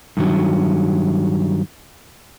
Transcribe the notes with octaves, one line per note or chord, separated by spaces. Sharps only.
G2 D#3 F#3